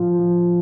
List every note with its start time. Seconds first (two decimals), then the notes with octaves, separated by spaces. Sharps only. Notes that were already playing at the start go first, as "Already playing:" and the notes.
Already playing: A2 F3 F4
0.20 F3